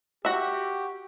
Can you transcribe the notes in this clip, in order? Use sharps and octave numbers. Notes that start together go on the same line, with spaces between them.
F#4 G4 E5